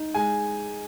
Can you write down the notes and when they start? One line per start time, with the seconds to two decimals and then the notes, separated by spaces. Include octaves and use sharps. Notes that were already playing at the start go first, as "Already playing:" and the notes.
Already playing: D#4
0.14 G#3 G#5